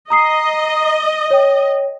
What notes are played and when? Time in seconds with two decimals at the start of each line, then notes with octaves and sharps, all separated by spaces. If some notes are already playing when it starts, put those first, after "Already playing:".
0.10 D#5 A#5 D#6 C7
1.31 C#5 G5